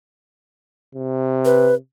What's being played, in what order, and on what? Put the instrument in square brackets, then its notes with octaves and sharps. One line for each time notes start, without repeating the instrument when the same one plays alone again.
[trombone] C3
[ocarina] B4